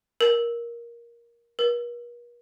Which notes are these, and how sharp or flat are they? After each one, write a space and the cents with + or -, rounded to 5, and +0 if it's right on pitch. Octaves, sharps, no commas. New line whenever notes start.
A#4 +15
A#4 +45